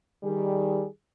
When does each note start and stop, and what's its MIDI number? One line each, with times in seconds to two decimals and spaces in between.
0.23 0.86 51
0.23 0.86 55
0.23 0.86 68